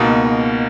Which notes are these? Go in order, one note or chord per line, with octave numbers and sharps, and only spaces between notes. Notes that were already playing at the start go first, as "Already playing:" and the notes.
Already playing: C#2 B2 A#3 D#4